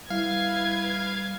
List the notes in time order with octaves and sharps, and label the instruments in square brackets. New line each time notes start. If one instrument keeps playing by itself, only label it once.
[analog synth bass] G3 [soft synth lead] E4 [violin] B4 G#6 [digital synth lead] F5